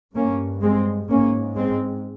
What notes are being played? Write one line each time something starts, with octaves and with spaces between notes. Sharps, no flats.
G2 A#3 C#4
G#3 C4
G#2 A#3 C#4
G#3 C4